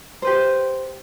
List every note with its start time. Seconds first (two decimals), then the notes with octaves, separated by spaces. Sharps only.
0.22 G4 B4 C5